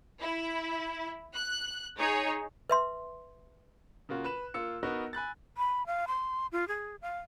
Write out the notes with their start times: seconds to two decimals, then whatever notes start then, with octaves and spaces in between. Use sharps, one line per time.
0.20 E4
1.34 F#6
1.98 D#4 G#4 C#5
2.70 B4 E5 C6
4.09 C#3 A#3 F4 F#4
4.24 B4 F#6 E7
4.54 A#3 F4 E6 C#7
4.83 B3 D#4 F#4 A#4
5.13 G#5 B5 F#6 A6
5.57 B5
5.86 F5
6.08 C6
6.52 F4
6.68 G#4
7.02 F5